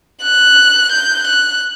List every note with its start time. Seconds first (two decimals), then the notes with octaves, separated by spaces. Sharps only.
0.22 F#6
0.91 G6
1.27 F#6